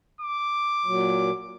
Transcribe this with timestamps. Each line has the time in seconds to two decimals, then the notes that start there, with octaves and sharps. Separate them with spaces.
0.21 D6
0.86 A#2 F#3